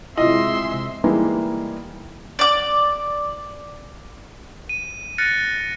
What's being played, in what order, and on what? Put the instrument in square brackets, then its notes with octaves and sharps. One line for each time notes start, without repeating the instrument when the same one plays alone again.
[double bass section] C3 G#3 [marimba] E4 F4 [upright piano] D#5 [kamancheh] E5 C6
[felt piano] E3 G3 G#3 A#3 D#4 E4
[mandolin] D5 D6
[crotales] D#7
F6 F#6 A6 A#6 C#7 D#7